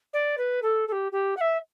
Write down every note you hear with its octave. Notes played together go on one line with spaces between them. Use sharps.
D5
B4
A4
A4
G4
G4
F#5
E5